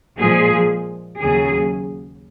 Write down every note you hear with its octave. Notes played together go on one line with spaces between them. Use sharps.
A#2 F3 G#3 G#4
D#2 C#3 F#3 G#4